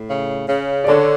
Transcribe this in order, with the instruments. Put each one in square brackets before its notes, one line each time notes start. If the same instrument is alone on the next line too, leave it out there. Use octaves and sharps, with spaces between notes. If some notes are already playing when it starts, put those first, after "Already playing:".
Already playing: [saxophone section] A2
C#3
C#3
[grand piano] D5
[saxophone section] D3 [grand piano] A4 C#5